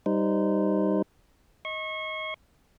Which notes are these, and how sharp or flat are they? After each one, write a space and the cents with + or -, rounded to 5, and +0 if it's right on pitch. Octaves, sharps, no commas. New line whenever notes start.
G3 +0 D#4 +0 C5 -25
D#5 +15 C#6 -30